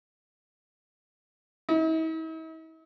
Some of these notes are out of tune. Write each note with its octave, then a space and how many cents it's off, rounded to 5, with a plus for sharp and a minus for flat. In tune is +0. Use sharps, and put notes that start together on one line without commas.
E4 -45